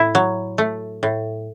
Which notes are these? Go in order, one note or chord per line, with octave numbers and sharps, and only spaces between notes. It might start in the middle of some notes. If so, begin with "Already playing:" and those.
Already playing: A2 E4
F#3
A3
A2